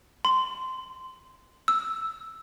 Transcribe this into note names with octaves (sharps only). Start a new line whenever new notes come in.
C6
E6